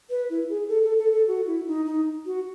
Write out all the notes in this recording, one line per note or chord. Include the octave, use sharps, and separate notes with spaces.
B4
E4
G#4
A4
A4
A4
A4
F#4
E4
D#4
D#4
F#4